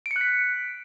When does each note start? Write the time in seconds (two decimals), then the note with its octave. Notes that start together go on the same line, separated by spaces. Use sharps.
0.06 D7
0.11 C#7
0.16 F#6
0.21 B6